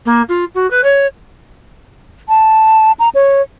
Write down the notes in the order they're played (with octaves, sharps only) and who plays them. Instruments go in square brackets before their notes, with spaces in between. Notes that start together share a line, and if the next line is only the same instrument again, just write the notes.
[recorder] A#3
F4
F#4
B4
C#5
[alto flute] A5
A#5
C#5